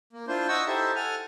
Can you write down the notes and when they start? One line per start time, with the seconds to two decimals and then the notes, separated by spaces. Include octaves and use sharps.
0.13 A#3
0.28 D4 E4 F4 C5
0.49 D#5 F#5 C#6 E6
0.67 D#4 E4 G4 A4 C5 E5
0.96 A4 F#5 G#5 F6